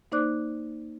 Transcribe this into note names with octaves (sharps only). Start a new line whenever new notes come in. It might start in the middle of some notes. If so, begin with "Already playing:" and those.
A#3 D#4 C5 D5 D6 F#6